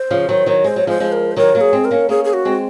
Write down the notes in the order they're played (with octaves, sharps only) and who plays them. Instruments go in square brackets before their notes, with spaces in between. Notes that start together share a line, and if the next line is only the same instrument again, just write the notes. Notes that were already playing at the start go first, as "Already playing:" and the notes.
Already playing: [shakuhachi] C5
[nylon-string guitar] C#3 F3
D#3 F#3
D#3 F#3
[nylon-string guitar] G#3 [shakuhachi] C5
[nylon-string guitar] F#3
[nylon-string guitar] F3 G#3 [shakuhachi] C5
[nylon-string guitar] F3 G#3
[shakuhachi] A#4
C5
[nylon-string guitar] D#3 F#3 [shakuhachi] A#4
[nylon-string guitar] F#3 A#3
[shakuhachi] G#4
[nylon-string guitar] G#3 C4
[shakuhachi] A#4
[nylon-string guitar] A#3 C#4
[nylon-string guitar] A#3 C#4 [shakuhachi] G#4
[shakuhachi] G#4
F#4
[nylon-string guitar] G#3 C4